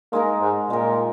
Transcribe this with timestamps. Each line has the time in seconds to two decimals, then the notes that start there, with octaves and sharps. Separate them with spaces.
0.12 G#3 A#3 D#4 A#4
0.41 G#2
0.70 A#2 G#3 D#4 A#4